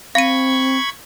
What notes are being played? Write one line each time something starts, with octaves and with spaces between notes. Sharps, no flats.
C4 F5 B5 C#6 G#6 D#7